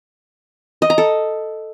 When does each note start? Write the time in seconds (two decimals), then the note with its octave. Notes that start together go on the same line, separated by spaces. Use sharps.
0.82 D#5
0.90 A#5
0.98 A4